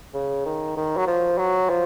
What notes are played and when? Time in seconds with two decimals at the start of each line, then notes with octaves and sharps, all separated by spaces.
0.14 C#3
0.46 D#3
0.77 D#3
0.97 F#3
1.07 F3
1.38 F#3
1.69 F3